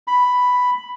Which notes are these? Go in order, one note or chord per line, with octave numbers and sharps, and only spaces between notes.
B5